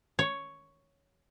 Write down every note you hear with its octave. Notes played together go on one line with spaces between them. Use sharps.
C#5